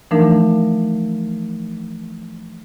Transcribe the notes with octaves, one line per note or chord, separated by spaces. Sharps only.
E3 F3 A3 D4 D#4 A#4